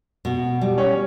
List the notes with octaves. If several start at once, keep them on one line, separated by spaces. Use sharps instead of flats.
B2
G3
C#4